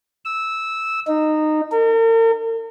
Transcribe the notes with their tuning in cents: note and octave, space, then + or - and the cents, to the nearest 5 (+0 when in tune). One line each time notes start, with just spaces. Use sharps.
E6 -10
D#4 -15
A#4 -45